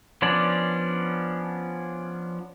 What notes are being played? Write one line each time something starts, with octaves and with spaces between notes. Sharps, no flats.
F3 B3 C#4 D4 D5